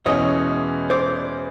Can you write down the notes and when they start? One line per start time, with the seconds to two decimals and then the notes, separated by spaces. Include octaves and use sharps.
0.06 E2 B2 G#3 C#4 E4 C#5 D#5
0.90 C5 D5